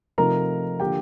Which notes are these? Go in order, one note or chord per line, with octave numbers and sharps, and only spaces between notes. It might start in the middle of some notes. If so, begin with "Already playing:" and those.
C3 F3 A3 D#4 A#4 A#5
D3 F3 A#3 G4 G5